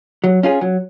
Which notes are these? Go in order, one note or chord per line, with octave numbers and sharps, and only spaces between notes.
F#3
C#4 F4 G#4
F#3